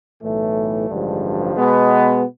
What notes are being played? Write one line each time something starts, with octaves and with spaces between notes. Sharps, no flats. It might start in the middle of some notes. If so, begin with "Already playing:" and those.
B1 A2 E3 A3
A1 G2 D3 F3 G#3
B2 G#3 B3